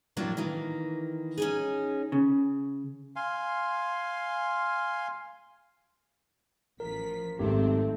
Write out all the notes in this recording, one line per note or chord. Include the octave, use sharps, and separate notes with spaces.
A2 F3 F#3 A#3 D4
D#3 E3 A#3
C#4 D#4 G#4
C#3
F5 G#5 C6
A1 F3 A#4 B6
G#1 D#3 F#3 A3 C4 G4